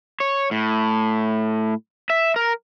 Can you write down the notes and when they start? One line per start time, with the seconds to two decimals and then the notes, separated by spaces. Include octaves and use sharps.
0.20 C#5
0.51 A2
2.10 E5
2.36 A#4